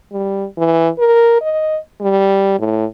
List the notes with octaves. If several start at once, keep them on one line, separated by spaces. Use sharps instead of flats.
G3
E3
A#4
D#5
G3
A2